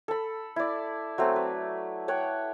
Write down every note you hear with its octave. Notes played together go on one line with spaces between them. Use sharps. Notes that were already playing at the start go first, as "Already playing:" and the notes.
A4 B5
E4 D5
F#3 A3 C4
B4
C#5 F#5 G5